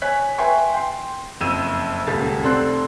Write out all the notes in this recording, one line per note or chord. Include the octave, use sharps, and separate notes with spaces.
C#5 G#5 F#6 B6
B4 E5 G5 G#5 C6 C#6
G5 C6
F#1 F2 E6 D#7 E7
D#1 C#2 A4 A6
F1 C4 A4 D5 C6 F#6